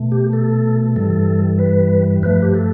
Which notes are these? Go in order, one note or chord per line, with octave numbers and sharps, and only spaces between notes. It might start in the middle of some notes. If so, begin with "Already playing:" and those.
Already playing: B2 A3
G4
A4
G2 E3 G3 A4
B4
G2 F3 A3 B4
G4
A4